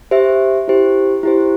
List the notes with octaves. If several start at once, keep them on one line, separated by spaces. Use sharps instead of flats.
G4 C5 E5
E4 G4 C5
E4 G4 C5